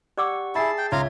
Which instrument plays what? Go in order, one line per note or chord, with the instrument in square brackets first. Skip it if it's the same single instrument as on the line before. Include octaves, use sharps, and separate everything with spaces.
[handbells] G4 F#5 C#6 [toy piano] D5 D6 E6
[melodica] E4 [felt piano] G#4 E5 [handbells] A5 A6 C7
[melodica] G5
[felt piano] C#2 [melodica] F4 F5 A#5 [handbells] C#5 E5 G#6